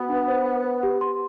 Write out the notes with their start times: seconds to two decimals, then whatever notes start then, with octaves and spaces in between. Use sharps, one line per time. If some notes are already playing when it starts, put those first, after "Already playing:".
Already playing: B3 F#4
0.09 D4
0.28 C5
0.46 F#5
0.64 B4
0.83 G4
1.01 C6